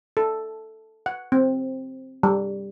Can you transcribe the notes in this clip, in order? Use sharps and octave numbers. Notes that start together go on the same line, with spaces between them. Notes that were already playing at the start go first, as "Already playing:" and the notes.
A4
F#5
C4
G3